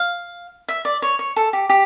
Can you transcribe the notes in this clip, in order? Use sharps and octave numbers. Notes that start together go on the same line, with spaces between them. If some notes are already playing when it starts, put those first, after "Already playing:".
Already playing: F5
E5
D5
C#5
C#5
A4
G4
G4